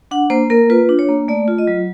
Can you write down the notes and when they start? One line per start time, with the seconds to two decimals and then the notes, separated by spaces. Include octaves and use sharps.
0.11 D4 F#5
0.30 A#3 C5
0.50 A#3 A#4
0.70 F4 B4
0.89 D4
0.99 C#5
1.09 A#3
1.28 A3 D5
1.48 F4
1.58 D#5
1.67 F#3